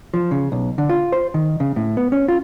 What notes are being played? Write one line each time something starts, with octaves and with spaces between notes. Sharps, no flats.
F3
C#3
B1
D3
F4
C5
D#3
C#3
A2
B3
C#4
F4